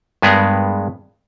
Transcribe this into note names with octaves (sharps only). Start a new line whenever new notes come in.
G2 G#3 B3 G#4 A#4